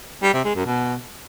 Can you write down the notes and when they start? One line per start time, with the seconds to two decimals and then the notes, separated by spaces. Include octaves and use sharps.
0.23 G3
0.33 C3
0.44 G#3
0.55 F#2
0.66 B2